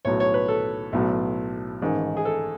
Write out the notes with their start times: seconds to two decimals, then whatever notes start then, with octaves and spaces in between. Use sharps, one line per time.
0.05 B1 A2 F#3 C#5
0.20 C#5
0.34 B4
0.48 A4
0.93 B1 A2 F#3
1.81 A1 G#2 D#3
2.17 G#4
2.25 A4